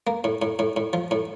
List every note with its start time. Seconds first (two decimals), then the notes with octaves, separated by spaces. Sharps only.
0.07 A#3
0.24 A2
0.42 A2
0.59 A2
0.77 A2
0.93 F3
1.11 A2